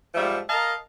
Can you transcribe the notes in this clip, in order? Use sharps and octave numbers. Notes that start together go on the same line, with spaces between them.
G#2 F3 G3 A3 E5
A#4 D#5 F5 A5 A#5